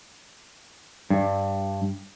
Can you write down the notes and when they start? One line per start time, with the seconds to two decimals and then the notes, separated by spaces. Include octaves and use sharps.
1.10 G2